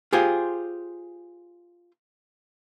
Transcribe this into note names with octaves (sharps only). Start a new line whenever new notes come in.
F4 G4 G#4 C5